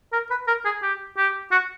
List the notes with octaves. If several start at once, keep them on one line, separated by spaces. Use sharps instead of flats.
A#4
B4
A#4
G#4
G4
G4
F#4